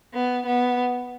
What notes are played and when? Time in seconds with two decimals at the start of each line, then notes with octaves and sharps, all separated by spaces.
0.14 B3
0.47 B3